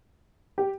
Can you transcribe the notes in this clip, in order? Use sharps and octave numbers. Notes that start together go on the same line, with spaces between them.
G4